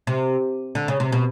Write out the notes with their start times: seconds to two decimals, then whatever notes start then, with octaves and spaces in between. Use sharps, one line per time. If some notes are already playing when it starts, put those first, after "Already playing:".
0.07 C3
0.75 D3
0.88 C#3
1.00 C3
1.12 B2